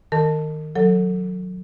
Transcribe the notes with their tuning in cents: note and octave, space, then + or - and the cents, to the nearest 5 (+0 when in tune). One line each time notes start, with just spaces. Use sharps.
D#3 +0 A#4 -35 A5 +0
F#3 -20 A4 +20 C#5 +0